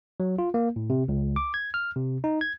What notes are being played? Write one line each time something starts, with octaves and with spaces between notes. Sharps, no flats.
F#3
F4
A#3
A2
C3
C#2
D6
G#6
F6
C3
D#4
G#6